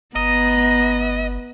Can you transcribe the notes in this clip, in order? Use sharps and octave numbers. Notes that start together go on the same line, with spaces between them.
G1 B3 D#5 A#5